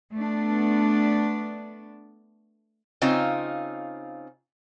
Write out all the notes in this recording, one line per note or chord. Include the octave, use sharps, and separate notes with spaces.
A3 B3 D4
C#3 C4 D#4 F4